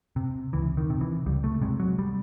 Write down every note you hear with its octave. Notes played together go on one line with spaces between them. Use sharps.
C3
C#2 E3
D#3
C3
E3
C#2 G3
A3
C3 G#3
F#3
G3